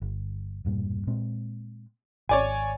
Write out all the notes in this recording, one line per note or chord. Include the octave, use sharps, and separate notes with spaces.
G1
E1 G2 A#2
A#2 G#3 C4
G#1 C#5 D5 G#5